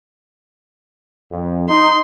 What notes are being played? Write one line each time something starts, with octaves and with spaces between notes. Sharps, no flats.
F2
D#4 C6